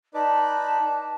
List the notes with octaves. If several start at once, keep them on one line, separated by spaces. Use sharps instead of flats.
D#4 B4 D5 A5